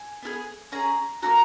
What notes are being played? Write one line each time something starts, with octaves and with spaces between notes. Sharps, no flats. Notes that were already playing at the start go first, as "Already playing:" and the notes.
Already playing: G#5
B3 F4 G#4
C#4 G#4 A#5
A#3 D#4 F#4 A#5